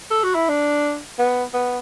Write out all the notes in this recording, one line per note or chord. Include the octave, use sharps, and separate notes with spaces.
A4
F#4
E4
D4
B3
B3